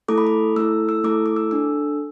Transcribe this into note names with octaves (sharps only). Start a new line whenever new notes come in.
A3 E4 A4 D6
B5
D6
A3 E4 A4 E6
E6
A3 E4 A4 D6
D6
E6
D4 A4 E6